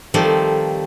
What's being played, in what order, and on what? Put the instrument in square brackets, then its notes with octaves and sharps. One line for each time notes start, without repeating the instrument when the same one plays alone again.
[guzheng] D#3 F3 G3 A3 C4